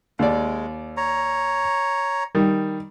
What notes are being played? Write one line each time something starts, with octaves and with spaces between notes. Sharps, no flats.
D#2 G#3 D5
C#5 A#5
D#3 G3